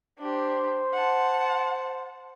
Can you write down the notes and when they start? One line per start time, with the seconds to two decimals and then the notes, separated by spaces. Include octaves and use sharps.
0.19 D4 G4 C5
0.93 F#5 A5